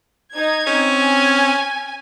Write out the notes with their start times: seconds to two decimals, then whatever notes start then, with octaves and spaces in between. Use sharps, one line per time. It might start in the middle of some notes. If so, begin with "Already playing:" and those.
0.33 D#4 G#6
0.67 C4 C#4
0.97 G#5